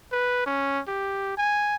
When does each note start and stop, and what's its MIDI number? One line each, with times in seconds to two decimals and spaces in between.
0.12 0.45 71
0.46 0.80 61
0.88 1.33 67
1.38 1.76 80